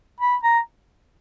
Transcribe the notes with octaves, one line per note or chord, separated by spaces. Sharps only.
B5
A#5